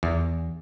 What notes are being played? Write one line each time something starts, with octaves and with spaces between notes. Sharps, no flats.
E2